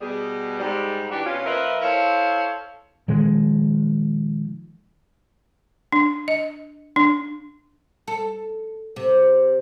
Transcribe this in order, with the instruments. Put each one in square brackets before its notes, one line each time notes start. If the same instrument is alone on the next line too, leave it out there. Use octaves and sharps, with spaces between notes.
[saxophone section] B2 G3 G#4
G#2 G3 G#3
E3 D4 F#4 G4
B2 C#4 F4
F3 A#3 A#4 B4 D#5 E5
E4 A4 C5 C#5 F5
[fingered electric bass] A#2 D#3 F3 G#3
[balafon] D4
D#5
D4
[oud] A4
C3